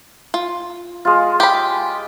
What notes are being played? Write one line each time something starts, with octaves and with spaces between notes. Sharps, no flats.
F4
G#3 F4
G4 B5